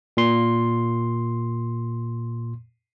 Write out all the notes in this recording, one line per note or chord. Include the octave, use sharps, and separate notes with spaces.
A#2 C6